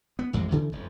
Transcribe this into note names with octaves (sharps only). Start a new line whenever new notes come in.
B3
A1 F2 E3 G#3
D#2 C#3 E3 F3
F1 F2